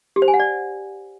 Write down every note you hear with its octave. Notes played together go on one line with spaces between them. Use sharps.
G4
C5
G#5
F#5
D5